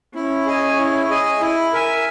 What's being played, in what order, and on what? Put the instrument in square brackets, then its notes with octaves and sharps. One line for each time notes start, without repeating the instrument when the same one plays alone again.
[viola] C#4 [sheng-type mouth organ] E4
[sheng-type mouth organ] G#4 D#5 G#5
E4
G#4 D#5 G#5
E4
A#4 E5 G#5